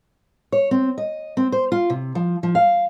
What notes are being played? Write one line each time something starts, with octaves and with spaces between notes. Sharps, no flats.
C#5
C4
D#5
C4
C5
F4
C3
F3
F3
F5